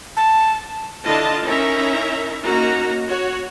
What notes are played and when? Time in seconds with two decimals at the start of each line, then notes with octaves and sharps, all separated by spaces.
0.17 A5
1.03 D3 D4 E4 F4 D#5 A5
1.46 C#4 D#4 E4 A#4 E5 A#5
2.45 A#3 C#4 D#4 F#4 A#5
3.08 F#4 C#5